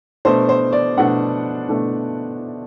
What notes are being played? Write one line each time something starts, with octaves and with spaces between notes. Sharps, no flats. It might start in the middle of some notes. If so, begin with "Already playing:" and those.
B2 A3 D4 C5
C5
D5
B2 A3 D4 F#5
B2 A3 D4